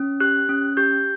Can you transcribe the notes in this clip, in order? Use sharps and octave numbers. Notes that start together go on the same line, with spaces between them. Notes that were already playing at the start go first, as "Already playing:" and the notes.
Already playing: C#4
G4 F#6
C#4
G4 G6